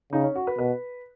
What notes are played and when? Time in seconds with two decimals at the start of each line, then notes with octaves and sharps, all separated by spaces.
0.12 C#3 D#4
0.24 C#4
0.36 F#4
0.47 B4
0.58 B2 B4